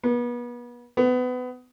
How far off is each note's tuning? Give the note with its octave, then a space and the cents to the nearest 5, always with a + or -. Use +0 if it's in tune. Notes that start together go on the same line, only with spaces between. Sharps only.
B3 -35
B3 +25